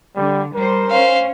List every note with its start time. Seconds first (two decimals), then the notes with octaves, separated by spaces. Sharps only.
0.16 D3 G3
0.55 G3 A#4 C5
0.91 C#4 C5 F5